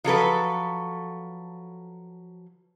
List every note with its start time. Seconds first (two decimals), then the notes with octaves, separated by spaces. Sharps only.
0.04 F3 F#3 A4 B4